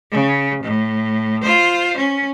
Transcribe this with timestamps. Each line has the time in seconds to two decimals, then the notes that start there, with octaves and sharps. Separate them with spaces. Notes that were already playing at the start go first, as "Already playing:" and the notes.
0.11 C#3
0.63 A2
1.42 F4 C5
1.97 C#4